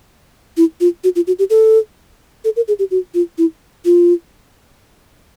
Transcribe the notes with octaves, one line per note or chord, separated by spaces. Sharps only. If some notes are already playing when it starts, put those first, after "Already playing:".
E4
F4
F#4
F4
F#4
G4
A4
A4
A#4
G#4
G4
F#4
F4
E4
F4